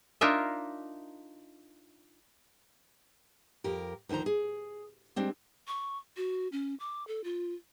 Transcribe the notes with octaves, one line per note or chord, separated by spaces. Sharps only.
D4 D#4 F4 A#4 E5
F2 G4 A#4
D2 D#3 F3 C5 A#5
G#4
G3 G#3 C4 D4
C#6
F#4
C#4
D6
A4
F4